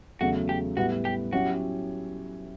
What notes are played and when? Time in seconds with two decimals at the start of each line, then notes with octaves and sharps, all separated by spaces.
0.21 E2 C#3 F#3 A3 F#4
0.49 G4
0.77 A2 G3 B3 E4 F#4
1.05 G4
1.33 F#3 C#4 E4 F#4 G4